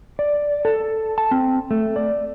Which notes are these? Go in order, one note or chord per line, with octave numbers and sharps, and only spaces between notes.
D5
A4
A5
C4
A3
D5